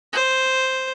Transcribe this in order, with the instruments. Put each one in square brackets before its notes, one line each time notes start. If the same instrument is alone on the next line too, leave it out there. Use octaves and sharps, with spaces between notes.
[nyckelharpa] C5